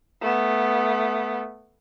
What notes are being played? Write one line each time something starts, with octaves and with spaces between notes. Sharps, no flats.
A3 B3